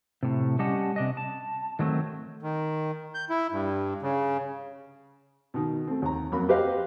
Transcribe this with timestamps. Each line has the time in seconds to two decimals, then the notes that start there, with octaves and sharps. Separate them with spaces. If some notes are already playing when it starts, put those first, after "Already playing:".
0.23 A2 C3
0.59 G3 C#4 G4 D#5 F#5 A5
0.96 C3 D4 D#5
1.17 A5
1.79 D#3 F#3 A3 C4
2.42 D#3
3.15 G6
3.29 E4
3.52 G2
4.02 C#3
5.54 B2 D#3
5.87 A3 C4
6.02 D#2 A#5
6.32 F2 F#3 A#3 B5
6.48 F#4 G4 B4 C5 D#5 F5